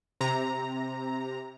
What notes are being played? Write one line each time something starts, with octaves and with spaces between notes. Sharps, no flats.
C3 A#5